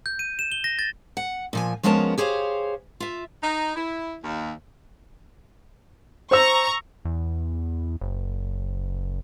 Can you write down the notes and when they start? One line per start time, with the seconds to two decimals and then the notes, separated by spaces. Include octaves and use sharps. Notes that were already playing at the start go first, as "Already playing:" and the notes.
0.06 G6
0.19 D#7
0.39 E7
0.52 G7
0.64 A#6
0.79 A6
1.17 F#5
1.53 A#2 F3 G#5
1.83 F3 G#3 B3 C#4 A#4 A5
2.18 G4 G#4 C5 C#5 F5
3.00 F4 E5
3.43 D#4
3.76 E4
4.24 D#2
6.31 C5 A#5 C#6 E6
7.05 E2
8.01 F#1